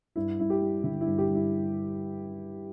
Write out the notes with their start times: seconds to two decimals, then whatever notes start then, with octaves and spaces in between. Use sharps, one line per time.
0.16 G2 E4
0.39 G2 E4
0.50 G4
0.62 G3
0.83 D3 E4
1.01 E4
1.07 G2
1.18 G4
1.30 G3
1.35 E4